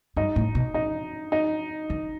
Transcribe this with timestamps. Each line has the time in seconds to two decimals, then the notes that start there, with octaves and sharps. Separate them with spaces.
0.16 G2 D#4
0.36 A2
0.55 B2
0.74 D#4
1.32 D#4
1.90 D#3